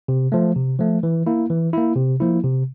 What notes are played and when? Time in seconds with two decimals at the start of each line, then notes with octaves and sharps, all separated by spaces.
0.08 C3
0.32 F3 A3
0.56 C3
0.79 F3 A3
1.03 E3
1.26 A#3 E4
1.50 E3
1.73 A#3 E4
1.96 C3
2.20 F3 A#3 E4
2.43 C3